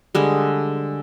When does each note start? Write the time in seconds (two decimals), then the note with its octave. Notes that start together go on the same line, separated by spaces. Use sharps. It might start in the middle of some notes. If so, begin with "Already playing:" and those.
0.15 D3 G3 G#3